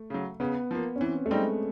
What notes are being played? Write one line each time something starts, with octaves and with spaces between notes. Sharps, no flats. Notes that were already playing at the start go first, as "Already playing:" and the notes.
Already playing: A3
C#3 F#3
C#3 B3
F3 A#3
C#4
E3 C4
A3
G3 G#3 C4 D#4